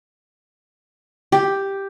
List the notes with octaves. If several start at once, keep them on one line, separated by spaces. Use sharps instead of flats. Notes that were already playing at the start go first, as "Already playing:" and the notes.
G4